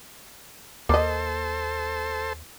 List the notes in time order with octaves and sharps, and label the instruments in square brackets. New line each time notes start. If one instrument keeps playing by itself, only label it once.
[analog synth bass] D#2 [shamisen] A#3 D#5 [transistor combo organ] A4 C5